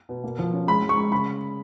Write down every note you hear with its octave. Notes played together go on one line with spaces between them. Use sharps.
B2
A#3
F3
C#4
G#3 B5
G#3
C#6
G#3
C#3 B5